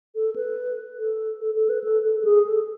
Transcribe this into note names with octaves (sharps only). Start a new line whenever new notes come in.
A4
B4
A4
A4
A4
B4
A4
A4
A4
G#4
A4